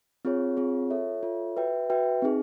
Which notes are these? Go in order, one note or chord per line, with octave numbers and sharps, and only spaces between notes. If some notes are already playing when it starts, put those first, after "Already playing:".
C4 F4 G#4 C#5
C4 F4 G#4 C#5
F4 A4 C#5 E5
F4 A4 C#5 E5
F#4 B4 E5 G5
F#4 B4 E5 G5
C4 D#4 G#4